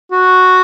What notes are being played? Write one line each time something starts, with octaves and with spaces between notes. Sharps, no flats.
F#4